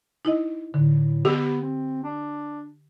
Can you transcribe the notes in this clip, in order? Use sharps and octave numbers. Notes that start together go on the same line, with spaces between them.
D#4 E4 D#5
A2 D3
B3 G4
C4
D4